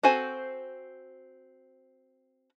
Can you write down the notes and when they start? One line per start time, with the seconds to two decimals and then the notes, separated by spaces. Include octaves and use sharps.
0.03 C4 F#4 A4 C5 G#5